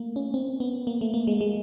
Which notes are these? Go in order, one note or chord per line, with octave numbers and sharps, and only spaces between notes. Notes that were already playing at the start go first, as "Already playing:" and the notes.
Already playing: A3 A#3
C#4
C4
B3
A#3
A3
A#3
G#3
G#3